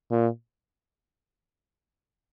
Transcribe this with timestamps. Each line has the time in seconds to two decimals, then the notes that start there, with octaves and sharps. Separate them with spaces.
0.11 A#2